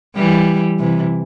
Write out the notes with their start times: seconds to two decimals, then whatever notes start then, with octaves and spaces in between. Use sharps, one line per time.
0.16 E3 G3
0.79 C3 E3